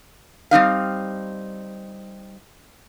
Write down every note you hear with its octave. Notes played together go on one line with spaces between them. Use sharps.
G3 C4 D#4 F5